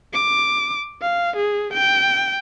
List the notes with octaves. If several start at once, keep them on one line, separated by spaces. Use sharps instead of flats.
D6
F5
G#4
G5